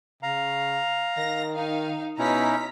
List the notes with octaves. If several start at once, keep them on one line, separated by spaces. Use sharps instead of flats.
C#3 F5 A#5
D#3 A#6
D#4 F5
B2 C#4 D#4 E4 A#5 B6